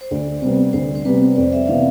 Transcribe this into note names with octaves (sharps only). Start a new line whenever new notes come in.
C5
D2 D5
C3 G3 B3 C5
D2 C5
C5
C3 G3 B3 B4
F2 D5
E5
C3 E3 B3 F5